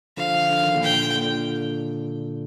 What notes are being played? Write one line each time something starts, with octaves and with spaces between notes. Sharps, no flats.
D3 F3 F5
D3
D#3
A#2 D3
G5
A#2 D3